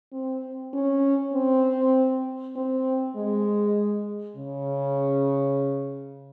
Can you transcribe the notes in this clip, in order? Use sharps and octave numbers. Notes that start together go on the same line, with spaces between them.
C4
C#4
C4
C4
G#3
C#3